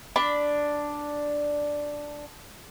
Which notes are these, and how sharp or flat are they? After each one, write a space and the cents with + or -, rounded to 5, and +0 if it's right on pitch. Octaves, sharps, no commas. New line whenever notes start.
D4 +0 B5 +10